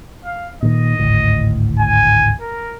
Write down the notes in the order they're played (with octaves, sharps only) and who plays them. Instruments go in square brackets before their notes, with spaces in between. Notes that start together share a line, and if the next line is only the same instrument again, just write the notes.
[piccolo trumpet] F5
[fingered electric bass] A#2 D#3 [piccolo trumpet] D#5
[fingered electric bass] G#1 D2 A2
[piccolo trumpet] G#5
A#4